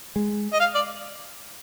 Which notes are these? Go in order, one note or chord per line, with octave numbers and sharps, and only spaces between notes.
G#3
D#5
F5
D5